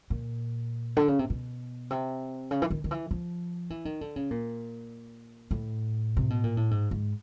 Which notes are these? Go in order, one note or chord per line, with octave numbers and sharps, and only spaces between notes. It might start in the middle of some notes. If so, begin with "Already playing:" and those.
A#2
D3
C#3
C3
B2
C3
C#3
E3
D#3
D#3
E3
F3
E3
D#3
D3
C#3
A#2
A2
C3
B2
A#2
A2
G#2
G#2